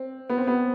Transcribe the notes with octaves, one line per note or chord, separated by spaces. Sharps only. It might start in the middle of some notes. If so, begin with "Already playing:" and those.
Already playing: C4
B3
C4
B3